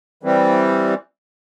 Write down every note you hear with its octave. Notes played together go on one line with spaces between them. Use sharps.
E3 G3 C4